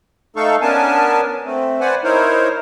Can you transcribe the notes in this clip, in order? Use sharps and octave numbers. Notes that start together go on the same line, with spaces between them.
A3 D#4 A4 F5 C#6
B3 C#4 D4 A#4 G#5 A5
A3 C4
B4 C5 D5 F#5 G#5
D#4 E4 A#4 C5 C#5